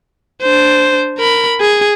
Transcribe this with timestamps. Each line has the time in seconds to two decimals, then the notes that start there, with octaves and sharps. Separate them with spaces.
0.42 D4 C5
1.18 A#4 B5
1.60 G#4